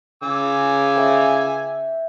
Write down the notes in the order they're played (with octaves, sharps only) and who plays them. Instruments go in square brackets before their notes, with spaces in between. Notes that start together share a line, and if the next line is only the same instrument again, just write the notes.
[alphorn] C#3 [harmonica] G#5 D6 E6
[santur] E5 G5